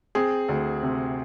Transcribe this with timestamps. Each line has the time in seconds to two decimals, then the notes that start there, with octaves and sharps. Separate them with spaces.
0.15 C4 G#4
0.49 D2
0.83 C3